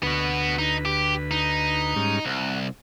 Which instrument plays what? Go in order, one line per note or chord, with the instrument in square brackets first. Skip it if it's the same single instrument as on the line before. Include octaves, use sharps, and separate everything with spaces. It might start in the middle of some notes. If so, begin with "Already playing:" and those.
[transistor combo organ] D2 B4 [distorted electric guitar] B3 F#4
[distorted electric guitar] D#4
G4
D#4
[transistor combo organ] G#2 G3 C#4
[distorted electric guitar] C2 [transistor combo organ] F#5